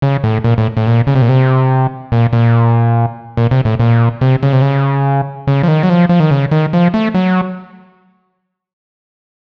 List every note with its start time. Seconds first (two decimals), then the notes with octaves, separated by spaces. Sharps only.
0.02 C#3
0.24 A2
0.44 A#2
0.58 A2
0.77 A2
0.87 A#2
1.07 C#3
1.15 C3
1.22 A#2
1.29 C3
2.12 A#2
2.33 A#2
3.37 A#2
3.51 C3
3.65 A2
3.80 A#2
4.21 C3
4.43 C#3
4.52 C3
4.62 C#3
5.47 C#3
5.63 F3
5.68 D#3
5.83 F#3
5.89 F3
6.09 F3
6.20 D#3
6.31 C#3
6.51 D#3
6.73 F3
6.94 A3
7.15 F#3